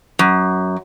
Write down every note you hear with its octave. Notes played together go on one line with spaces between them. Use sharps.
F#2